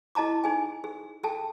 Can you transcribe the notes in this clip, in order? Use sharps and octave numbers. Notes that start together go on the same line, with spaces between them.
E4 D#5 A5 A#5 D6
D#4 G#4 G#5
G#4
G#4 A4 G5 A5